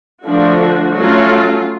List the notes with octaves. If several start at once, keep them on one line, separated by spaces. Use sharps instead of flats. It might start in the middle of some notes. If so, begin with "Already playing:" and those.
D3 F3 A3 D4 F#4
F#3 A3 C#4 F4